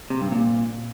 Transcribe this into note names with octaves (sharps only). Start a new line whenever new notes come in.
C3
G2
A#2